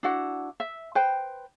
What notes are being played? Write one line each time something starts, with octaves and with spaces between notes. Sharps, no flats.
D4 E4 F#4 F#5
E5
B4 C5 G5